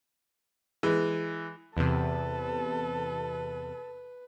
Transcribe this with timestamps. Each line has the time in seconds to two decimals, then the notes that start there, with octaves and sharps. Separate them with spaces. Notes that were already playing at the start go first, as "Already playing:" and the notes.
0.83 E3 G#3
1.77 E2 C3 A4 B4